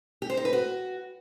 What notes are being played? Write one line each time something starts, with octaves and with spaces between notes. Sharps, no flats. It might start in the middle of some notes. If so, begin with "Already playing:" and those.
G4
C5
D#4
B4
F#4